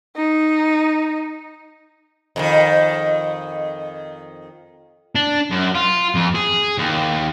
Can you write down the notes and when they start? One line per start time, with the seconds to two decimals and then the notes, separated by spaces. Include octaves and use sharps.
0.16 D#4
2.36 F2 C3 D#3
5.15 D4
5.51 F#2
5.75 F4
6.15 F2
6.35 G#4
6.78 D#2